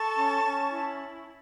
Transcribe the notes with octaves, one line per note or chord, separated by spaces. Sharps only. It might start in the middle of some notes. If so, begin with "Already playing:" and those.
Already playing: A4 A5 C#6
C#4
C#4
E4